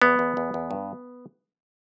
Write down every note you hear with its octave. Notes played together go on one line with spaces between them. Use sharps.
E2 B3
E2
E2
E2
G2